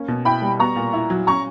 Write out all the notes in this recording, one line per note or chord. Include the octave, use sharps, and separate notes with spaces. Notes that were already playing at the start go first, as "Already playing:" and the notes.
Already playing: A#3 C#4
B2
E4 G5 B5
G3
B3 A#5 C#6
A#2
E4
F#3
C#4 A#5 C#6